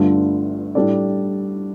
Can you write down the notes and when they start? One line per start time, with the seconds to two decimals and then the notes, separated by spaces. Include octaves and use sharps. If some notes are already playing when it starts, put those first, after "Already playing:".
Already playing: G1 G2 D3 A3 F4
0.75 A2 G3 D4 A4 D5